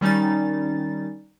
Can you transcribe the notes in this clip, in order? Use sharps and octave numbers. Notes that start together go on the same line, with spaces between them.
D#3 G3 C#4 D#4 A6